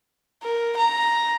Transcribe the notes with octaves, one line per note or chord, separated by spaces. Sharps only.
A#4
A#5